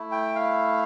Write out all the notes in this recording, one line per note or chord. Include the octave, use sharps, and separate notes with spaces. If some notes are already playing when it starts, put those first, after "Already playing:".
Already playing: A3 E4
G5
F5